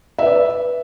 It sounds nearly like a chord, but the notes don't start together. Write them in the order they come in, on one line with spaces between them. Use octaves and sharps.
E5 B4 D5